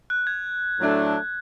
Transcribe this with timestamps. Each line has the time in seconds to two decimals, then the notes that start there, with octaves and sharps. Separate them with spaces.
0.10 F#6
0.27 G#6
0.79 A2 F#3 A3 D4 A4